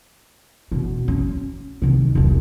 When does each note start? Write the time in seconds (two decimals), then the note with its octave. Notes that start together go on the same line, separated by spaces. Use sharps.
0.72 B2 C#4
1.08 C#4
1.82 C3 D#3
2.15 E1 C2